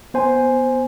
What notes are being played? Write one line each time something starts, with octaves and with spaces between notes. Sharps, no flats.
B3 C5 G#5